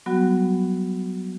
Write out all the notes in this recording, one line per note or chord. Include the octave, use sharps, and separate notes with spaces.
F#3 G3 B3 F#4